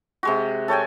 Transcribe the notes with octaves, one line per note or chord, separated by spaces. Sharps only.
C3 G#3 F#4
A4 C#5 G5 G#5